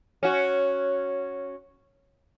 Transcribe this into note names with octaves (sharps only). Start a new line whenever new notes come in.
C#4 F#4